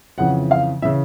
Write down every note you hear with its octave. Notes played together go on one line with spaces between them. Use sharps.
F2 C#3 E3 F#5
F5
C#3 E3 E5